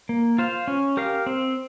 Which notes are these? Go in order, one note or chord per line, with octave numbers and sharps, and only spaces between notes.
A#3
F4 C5 F5
C#4
G4 A#4 F5
C4